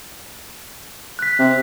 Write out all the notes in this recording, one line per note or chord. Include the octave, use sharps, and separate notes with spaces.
F#6 B6
C3